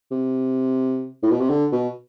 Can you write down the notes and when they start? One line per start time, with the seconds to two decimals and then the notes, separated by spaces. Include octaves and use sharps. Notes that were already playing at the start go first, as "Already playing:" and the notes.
0.12 C3
1.23 A2
1.31 B2
1.40 C3
1.50 D3
1.72 B2